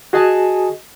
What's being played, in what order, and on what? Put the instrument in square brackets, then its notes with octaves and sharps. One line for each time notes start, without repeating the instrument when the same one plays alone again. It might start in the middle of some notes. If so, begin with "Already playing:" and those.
[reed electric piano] F#4 G#4 D#5 G#5 A5